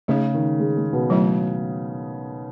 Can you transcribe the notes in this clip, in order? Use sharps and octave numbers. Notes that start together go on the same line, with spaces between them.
C#3 A3 D#4 G#4
D#3
G#3
G#3
B2
F#3 A3 E4